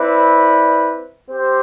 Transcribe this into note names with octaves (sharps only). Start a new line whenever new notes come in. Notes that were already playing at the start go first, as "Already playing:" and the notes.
Already playing: C4 E4 B4 D5
C4 G4 C5